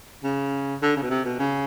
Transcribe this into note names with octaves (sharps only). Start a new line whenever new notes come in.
C#3
D3
C#3
B2
C3
B2
C#3